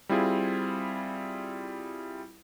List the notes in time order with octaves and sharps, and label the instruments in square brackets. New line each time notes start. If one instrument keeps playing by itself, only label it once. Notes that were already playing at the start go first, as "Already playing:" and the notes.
[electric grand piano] G3 C4 E4 F4 G#4